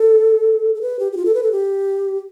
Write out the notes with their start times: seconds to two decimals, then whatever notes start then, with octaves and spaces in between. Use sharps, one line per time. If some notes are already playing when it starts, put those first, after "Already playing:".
Already playing: A4
0.75 A4
0.82 B4
0.99 G4
1.12 G4
1.17 F4
1.25 A4
1.34 B4
1.43 A4
1.52 G4